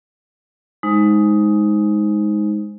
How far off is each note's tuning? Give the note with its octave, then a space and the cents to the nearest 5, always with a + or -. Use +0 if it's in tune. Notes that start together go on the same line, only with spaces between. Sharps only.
G#3 +0 D#4 +10 C5 +0